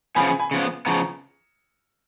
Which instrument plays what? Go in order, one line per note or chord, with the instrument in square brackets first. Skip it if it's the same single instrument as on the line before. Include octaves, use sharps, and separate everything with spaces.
[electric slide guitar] C#3 F3 B3 [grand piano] G#5 B5
[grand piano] G#5 B5
G#5 B5
[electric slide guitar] C#3 F3 B3
[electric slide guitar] C#3 F3 B3 [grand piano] A#5 C#6